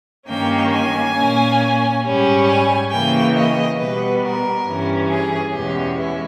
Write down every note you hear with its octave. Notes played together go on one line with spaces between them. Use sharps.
G2 D#3 A#3 C#4 G5
G#5
A#2 A#3 C#4
G#2 G3 C#4
G#5
C#3 E3 A#3 G5
D#5
B2 G3 B3 B4
A#4
G2 E3 G3 C#4
G#4
E2 B2 G#3 C#4 G4
E4